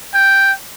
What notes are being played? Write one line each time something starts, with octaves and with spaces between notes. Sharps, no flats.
G5